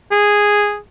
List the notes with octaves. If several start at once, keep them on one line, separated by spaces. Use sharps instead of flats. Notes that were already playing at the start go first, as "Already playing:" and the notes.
G#4